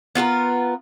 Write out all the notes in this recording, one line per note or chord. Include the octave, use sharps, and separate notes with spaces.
B3 F4 A4 A#4